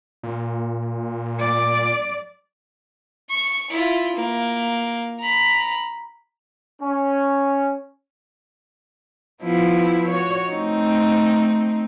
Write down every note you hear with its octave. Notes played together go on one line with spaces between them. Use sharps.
A#2
D5
C#6
E4 F4
A#3
A#5 B5
C#4
F3 B3 E4
F#4 C#5
A3 C4 D#4